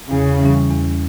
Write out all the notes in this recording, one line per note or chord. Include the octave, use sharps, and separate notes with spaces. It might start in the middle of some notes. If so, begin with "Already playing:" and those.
E2 C#3
E3 G3 C#4
E2